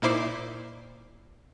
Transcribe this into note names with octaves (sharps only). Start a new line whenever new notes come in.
A#2 D#4 E4 C5 D6 C7